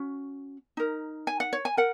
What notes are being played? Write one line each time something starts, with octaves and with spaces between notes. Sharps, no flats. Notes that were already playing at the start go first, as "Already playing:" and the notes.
Already playing: C#4 F#4
D#4 A#4
G#5
F#5
C#5
G#5
A#4 F#5